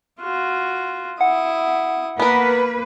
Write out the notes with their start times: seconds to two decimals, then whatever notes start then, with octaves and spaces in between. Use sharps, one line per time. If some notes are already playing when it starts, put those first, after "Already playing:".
0.20 F4 F#4
1.21 E4 F#5 D#6
2.19 A#3 B3 A#4 B4